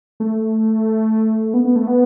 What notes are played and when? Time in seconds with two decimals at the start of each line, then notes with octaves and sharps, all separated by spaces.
0.20 A3
1.54 B3
1.65 B3
1.76 A3
1.87 B3